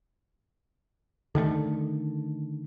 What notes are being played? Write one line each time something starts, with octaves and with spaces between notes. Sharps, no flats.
D3 D#3 G3 A3